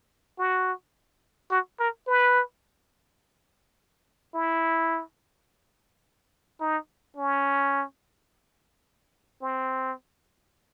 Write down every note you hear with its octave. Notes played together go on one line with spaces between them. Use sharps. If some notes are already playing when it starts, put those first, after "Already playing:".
F#4
F#4
A#4
B4
E4
D#4
C#4
C4